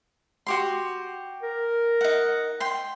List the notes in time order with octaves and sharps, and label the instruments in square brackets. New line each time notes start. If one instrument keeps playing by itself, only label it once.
[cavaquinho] F#4 G4 C6
[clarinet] A#4
[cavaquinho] D#4 F#5
G5 C6